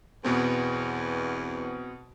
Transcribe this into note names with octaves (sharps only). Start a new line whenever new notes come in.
E2 B2 B3 C4